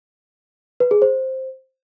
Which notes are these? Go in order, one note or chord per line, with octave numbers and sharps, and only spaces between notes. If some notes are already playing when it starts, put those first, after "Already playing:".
B4
G#4
C5